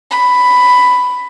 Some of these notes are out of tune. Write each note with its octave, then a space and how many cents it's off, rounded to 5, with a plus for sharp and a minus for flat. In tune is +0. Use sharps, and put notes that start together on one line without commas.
B5 +10